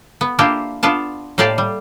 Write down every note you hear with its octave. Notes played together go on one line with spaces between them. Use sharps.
B3
A#3 D4 E4 F4 G4
B3 D4 F4 A5
A2 A#3 G4 D5 F5 A5
G3